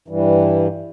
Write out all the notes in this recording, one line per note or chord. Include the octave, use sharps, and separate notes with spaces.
G2 E3 G3